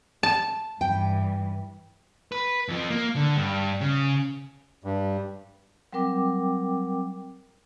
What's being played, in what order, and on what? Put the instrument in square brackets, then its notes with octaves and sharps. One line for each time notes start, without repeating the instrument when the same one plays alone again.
[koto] A5
[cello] G2 E3 [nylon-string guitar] G5
[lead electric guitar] B4
F2 F3
A#3
D3
G2
C#3
[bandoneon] G2
[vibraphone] F#3 G3 C4 A#4 G5 D6